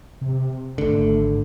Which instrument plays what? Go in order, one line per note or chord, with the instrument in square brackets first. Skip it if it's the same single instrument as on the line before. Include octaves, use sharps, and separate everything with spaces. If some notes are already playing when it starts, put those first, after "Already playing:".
[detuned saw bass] C3
[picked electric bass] G#1 D3 [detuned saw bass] A3